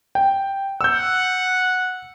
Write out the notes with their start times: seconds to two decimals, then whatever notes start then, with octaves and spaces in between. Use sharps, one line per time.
0.15 G5
0.81 F#5 E6 G6